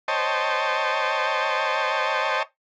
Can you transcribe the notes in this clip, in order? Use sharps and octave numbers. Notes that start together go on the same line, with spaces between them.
C5 C#5 D#5 G5 A5